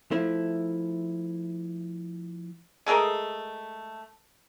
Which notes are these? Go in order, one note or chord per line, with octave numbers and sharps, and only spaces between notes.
F3 A3 E4
G#3 A3 G#4 A#4